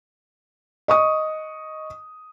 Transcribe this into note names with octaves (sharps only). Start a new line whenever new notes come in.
D#5 C#6 D#6